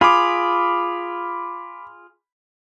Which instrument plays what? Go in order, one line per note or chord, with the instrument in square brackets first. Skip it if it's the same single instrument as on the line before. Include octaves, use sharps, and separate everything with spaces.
[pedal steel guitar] F4 G#4 [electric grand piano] B5 D6